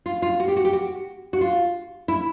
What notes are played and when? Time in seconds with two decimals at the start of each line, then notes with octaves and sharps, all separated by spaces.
0.06 F4
0.22 F4
0.40 F#4
0.48 G4
0.57 F#4
0.65 G4
0.73 F#4
1.33 F#4
1.41 F4
2.08 E4